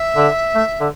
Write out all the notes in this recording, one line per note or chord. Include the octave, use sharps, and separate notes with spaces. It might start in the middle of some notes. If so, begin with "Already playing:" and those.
Already playing: E5
D3
A3
D3